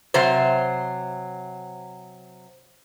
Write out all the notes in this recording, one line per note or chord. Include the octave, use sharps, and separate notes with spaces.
C3 F#3 C5